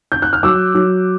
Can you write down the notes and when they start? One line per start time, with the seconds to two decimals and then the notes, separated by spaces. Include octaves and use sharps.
0.12 G6
0.22 F#6
0.33 F6
0.43 F#3 D6 E6
0.75 F#3